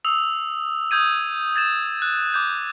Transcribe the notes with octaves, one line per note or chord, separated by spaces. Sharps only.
D#6 E6 F7
D#6 G6 G#6 D#7
G#6 A6 E7
F#6
D6 G6